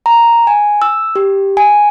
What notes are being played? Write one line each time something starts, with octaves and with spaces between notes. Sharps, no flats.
A#5
G#5
E6
G4
G#5